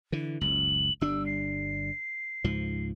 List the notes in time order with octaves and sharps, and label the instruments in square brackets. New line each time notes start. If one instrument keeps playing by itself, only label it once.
[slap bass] D3 E3
[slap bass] F#1 C#2 [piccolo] F#7
[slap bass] G1 G3 D4 [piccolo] E6
[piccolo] C7
[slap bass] C#2 G#2 F3